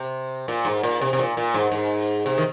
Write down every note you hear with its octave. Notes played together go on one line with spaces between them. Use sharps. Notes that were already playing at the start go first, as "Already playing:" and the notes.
Already playing: C3
A#2
G#2
A#2
C3
C3
A#2
A#2
G#2
G#2
C3
D#3